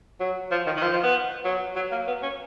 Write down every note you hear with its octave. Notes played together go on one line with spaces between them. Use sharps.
F#3
F3
D#3
D#3
F3
F3
B3
F#3
F#3
A#3
B3
C#4